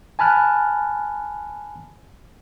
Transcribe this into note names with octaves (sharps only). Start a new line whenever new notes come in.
G#5 A5 B5 F6 F#6